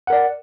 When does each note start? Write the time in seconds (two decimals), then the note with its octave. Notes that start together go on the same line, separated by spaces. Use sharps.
0.07 F#5
0.10 A#4
0.13 D5